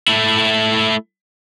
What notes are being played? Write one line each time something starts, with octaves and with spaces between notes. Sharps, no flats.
A3 E4